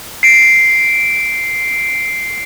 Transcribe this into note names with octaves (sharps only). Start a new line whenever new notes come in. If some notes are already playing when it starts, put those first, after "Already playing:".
C7 D7